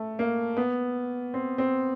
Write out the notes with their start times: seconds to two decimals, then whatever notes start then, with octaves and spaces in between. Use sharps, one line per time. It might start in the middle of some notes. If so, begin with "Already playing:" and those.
Already playing: A3
0.19 A#3
0.57 B3
1.34 C4
1.58 C4